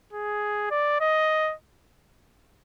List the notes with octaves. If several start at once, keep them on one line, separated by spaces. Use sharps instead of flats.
G#4
D5
D#5